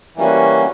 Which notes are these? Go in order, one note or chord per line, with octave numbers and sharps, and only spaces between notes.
E3 G3 A#3 C#4 F#4